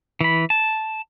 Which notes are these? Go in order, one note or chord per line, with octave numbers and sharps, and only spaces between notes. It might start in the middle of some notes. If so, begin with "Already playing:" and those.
E3 B5
A5